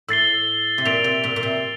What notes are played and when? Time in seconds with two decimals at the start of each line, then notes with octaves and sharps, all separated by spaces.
0.09 A2 E6 A6 C7 G7
0.78 C3
0.85 A#2 A6 D7 F7
1.04 C3
1.24 A#2
1.36 A#2
1.43 C3